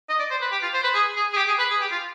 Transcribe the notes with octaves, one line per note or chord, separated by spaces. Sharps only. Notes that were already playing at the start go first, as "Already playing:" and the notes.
D#5
D5
C5
B4
G4
F4
C5
B4
G#4
G#4
G#4
G4
G#4
B4
G#4
G4
F4